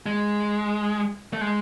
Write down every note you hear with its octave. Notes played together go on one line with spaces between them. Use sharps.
G#3
A3
G#3